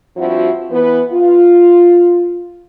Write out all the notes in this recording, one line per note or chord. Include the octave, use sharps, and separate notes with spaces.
G2 F3 C4 E4 F#4
E3 B3 B4
F4